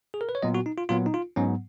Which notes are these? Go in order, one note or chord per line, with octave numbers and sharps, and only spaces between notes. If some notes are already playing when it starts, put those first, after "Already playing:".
G#4
A#4
B4
C#5
A#2 F#3 B3 D#5
F#4
D#4
F4
A#2 F#3 B3 F4
D#4
F4
G#2 F#3 B3 C#4